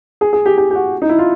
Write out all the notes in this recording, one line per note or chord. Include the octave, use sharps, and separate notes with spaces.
G#4
G#4
G4
G4
G4
F#4
D#4
E4
F4